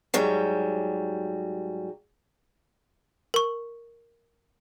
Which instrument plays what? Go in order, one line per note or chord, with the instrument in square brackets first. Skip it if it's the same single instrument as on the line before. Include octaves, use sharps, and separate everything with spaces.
[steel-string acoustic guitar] G#2 F#3 G3
[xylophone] A#4 C#6